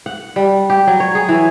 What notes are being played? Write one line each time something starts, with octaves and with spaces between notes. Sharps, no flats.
F#5
G3
G4
F#3
C#5
G#4
E3